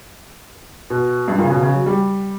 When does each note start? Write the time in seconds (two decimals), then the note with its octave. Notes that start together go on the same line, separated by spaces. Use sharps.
0.90 B2
1.28 G2
1.38 A#2
1.44 C#3
1.50 B2
1.63 C#3
1.74 F#3
1.86 G3